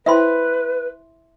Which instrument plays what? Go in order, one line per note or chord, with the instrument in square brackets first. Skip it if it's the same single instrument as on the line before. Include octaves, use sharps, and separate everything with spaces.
[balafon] E4 C5 G5 [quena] B4 [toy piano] E5 C6